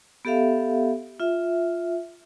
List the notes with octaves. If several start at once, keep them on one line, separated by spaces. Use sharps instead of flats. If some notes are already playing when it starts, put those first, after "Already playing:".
B3 G4 A4 E5 F5
F4 E5